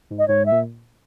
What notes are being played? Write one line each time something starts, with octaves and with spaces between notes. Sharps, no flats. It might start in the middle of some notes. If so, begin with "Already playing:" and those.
G#2
D#5
G#2 C#5
E5
A#2